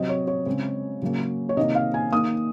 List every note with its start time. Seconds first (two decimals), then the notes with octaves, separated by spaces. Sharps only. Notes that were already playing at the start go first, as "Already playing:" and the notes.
Already playing: C3 F#3 C4 D#5
0.09 C#5
0.27 C#5
0.46 C#3 G#3 C4
1.02 C#3 F#3 A#3
1.49 C#5
1.57 C3 D#3 A#3 D#5
1.75 F5
1.94 G#5
2.12 D#3 A#3 D#6